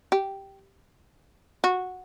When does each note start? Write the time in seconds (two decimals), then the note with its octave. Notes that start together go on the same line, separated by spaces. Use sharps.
0.12 G4
1.64 F#4